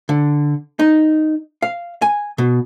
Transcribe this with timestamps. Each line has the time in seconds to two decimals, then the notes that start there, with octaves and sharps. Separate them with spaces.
0.09 D3
0.79 D#4
1.62 F5
2.02 G#5
2.38 B2